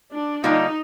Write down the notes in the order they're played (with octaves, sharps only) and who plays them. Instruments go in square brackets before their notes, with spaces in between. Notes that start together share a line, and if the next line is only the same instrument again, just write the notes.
[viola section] D4
[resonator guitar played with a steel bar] D3 G3 A#3 D4 F4 [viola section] D#4